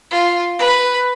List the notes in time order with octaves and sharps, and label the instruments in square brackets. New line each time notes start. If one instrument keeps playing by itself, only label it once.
[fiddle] F4
B4